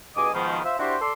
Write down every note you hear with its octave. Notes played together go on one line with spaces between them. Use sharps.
G2 B2 G#4 D#5 G#5 D6
G#2 B2 D#3 F3
F4 C5 E5
D4 E4 F#4 G4 C5
A4 D5 C6